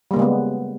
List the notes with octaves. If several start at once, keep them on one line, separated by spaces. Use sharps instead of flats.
C#3 G3 G#3 A#3 B3